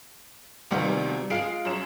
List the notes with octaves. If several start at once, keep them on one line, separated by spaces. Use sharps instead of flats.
D2 C3 D#3 G3 B3 F4
G#3 F4 G#4 F5 C7 D7
F#2 C#5 E7